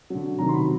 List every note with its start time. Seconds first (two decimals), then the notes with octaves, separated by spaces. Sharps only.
0.10 D3 F#3
0.39 C3 D#3 F#3 A#5
0.49 C6
0.54 B5